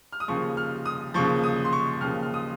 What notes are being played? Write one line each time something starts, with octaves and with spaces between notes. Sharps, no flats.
F6
D#6
D#2 C#3 F3 C#6
F6
D#6
D#2 C#3 F3 C#6
D#6
C6
C#6
D#2 C#3 F3 F6
F6
D#6